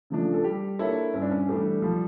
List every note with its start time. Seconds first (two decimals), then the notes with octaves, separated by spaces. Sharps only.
0.10 C#3 F3 A3 D4
0.34 A4
0.44 G3 G4
0.79 A#3 D4 E4 A4 C#5
1.14 G2 C#4
1.22 D4
1.31 C#4
1.48 E3 G3 A3 D4 G4
1.82 F3 G3